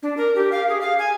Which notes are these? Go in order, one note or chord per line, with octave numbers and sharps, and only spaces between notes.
D4
A#4
G4
F5
G#4
F5
G#5